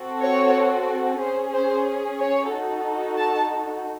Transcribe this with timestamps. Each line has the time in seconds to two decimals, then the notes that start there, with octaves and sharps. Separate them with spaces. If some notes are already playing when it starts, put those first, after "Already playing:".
Already playing: C4 F#4 A4
0.22 C#5
1.20 C#4 G#4 C5
1.54 C5
2.19 C#5
2.52 D#4 F#4 A4
3.17 A5